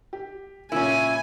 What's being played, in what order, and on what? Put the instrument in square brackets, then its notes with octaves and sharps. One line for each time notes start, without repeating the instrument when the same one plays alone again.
[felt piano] G4
[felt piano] A#2 C#3 F4 [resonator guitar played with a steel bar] C#4 E4 [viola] G#5